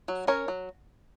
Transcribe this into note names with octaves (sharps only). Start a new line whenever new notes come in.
F#3
C#4 A#4 C#5
F#3